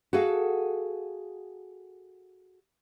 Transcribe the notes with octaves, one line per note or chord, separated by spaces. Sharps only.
F#4 G#4 A4 F5